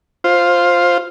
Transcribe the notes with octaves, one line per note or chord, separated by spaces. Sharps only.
F4 C5